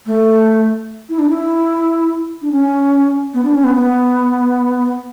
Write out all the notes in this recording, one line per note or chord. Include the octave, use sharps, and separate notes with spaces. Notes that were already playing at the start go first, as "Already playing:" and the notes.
A3
E4
D4
E4
D4
C#4
B3
D4
C#4
B3
B3